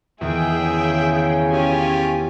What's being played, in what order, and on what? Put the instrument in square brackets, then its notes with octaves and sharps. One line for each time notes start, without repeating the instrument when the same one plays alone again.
[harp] E2 D#3 [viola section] G#4 G5 [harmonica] E5
[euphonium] C#3
[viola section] C#4 G#5 [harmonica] F4 G4